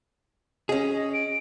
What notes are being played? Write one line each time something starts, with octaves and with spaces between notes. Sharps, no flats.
C#4 G#4 D#5
D7